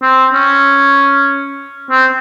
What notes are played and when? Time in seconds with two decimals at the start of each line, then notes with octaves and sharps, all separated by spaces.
0.03 C4
0.33 C#4
1.91 C4